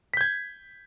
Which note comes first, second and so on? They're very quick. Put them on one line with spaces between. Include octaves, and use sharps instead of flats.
B6 G6 G#6